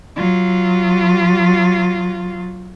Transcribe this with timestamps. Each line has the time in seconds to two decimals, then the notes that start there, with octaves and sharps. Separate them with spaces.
0.15 F#3 F4